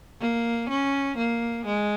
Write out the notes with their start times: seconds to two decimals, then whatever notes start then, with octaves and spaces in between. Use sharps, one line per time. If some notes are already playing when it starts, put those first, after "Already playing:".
0.21 A#3
0.69 C#4
1.17 A#3
1.66 G#3